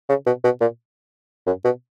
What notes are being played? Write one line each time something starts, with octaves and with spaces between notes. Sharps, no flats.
C#3
B2
B2
A#2
F#2
B2